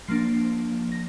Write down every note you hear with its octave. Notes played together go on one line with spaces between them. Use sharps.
F3 A#3 D4 C7
A#6